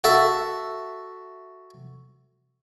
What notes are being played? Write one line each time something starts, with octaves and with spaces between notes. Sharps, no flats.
F#4 A4 E5